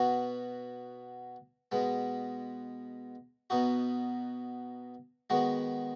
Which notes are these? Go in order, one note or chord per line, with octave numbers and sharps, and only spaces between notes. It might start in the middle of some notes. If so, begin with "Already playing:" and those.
Already playing: B2 B3 F#4
B2 G#3 B3
B2 B3 D#4 F#4
D#3 G#3 B3 F#4